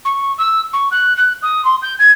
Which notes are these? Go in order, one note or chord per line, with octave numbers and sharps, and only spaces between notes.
C#6
E6
C#6
F#6
F#6
D#6
C6
G6
G#6